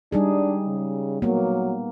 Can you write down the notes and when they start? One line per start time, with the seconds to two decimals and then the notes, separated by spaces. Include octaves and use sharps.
0.12 G3 D4 D#4 G#4
0.66 C#3
1.22 F#3 A#3 B3